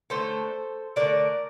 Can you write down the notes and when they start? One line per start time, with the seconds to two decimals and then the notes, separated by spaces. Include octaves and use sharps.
0.10 D3 A3 A4 C5
0.96 D3 A3 A#4 D5